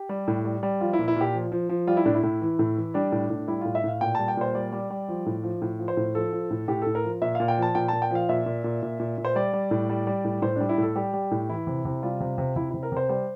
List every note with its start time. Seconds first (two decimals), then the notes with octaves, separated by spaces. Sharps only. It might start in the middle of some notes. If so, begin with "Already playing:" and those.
Already playing: G4
0.09 G3
0.28 A2
0.45 G3
0.63 G3
0.81 F3 F4
0.93 E4
0.99 A#2
1.08 E4
1.16 A#2 G4
1.34 F3
1.52 F3
1.69 F3
1.87 G3 F4
1.97 E4
2.05 A2 D4
2.15 E4
2.23 A2
2.41 E3
2.59 A2
2.77 E3
2.94 G3 D4
3.12 A2
3.30 A2
3.48 G3 E4
3.61 A2 F4
3.75 E5
3.84 A2 F5
4.01 A#2 G5
4.15 G3 A5
4.28 G5
4.37 A#2 C5
4.55 G3 D5
4.72 G3
4.90 G3
5.08 F3
5.26 A2
5.44 F3
5.62 A2
5.79 F3
5.88 C5
5.97 A2
6.15 F3 A4
6.32 F3
6.51 A2
6.68 A2 G4
6.82 A2 A4
6.95 A#4
7.04 F3
7.22 A#2 E5
7.35 A#2 F5
7.48 G5
7.57 F3 A5
7.75 A#2 G5
7.88 A#2 A5
8.02 G5
8.11 F3 F5
8.29 A#2 E5
8.46 A#2
8.64 A#2
8.83 A#2
9.00 A#2
9.18 A#2
9.25 C5
9.35 G3 D5
9.53 G3
9.71 A2
9.89 G3
10.07 G3
10.25 A2
10.42 A2 C5
10.56 G3 D4
10.69 E4
10.78 A2 A4
10.96 G3 G4
11.14 G3
11.31 A2
11.49 E3 E4
11.67 C3
11.85 C3
12.03 G3 F4
12.20 C3
12.38 C3
12.56 C3 E4
12.70 C3 E4
12.83 A#4
12.92 C3 C5
13.09 G3 C5